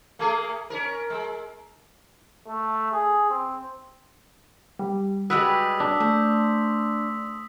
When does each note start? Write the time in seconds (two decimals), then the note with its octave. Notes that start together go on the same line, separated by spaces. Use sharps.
0.19 A3 A#3 G#4
0.70 C#4 A#4
1.10 G#3
2.47 A3
2.92 G#4
3.30 C4
4.79 G3
5.30 G3 G#3 F#4 B4 D#6 E6 B6
5.80 D4
6.00 A3 C5